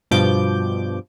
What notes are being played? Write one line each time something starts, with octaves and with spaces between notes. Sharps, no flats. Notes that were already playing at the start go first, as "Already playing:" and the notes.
G2 B2 F3 D6 G6